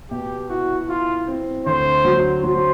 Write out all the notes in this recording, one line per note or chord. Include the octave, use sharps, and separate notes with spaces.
B2 G4
E4 F#4
E4 F4
C4
D2 C5
F#3
F#3 C5